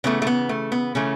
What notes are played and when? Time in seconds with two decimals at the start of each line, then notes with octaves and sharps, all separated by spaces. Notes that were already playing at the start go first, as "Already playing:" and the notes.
0.04 C#3 E3 A3 B3
0.22 A3
0.27 B3
0.49 A3
0.72 B3
0.95 C#3 E3 A3 C#4